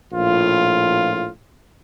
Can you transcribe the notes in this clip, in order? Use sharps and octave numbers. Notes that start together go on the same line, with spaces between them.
A#1 A2 F4